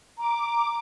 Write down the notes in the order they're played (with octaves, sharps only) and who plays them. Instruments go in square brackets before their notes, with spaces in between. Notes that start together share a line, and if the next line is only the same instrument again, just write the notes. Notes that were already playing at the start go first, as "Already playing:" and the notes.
[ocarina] A#5 [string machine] D6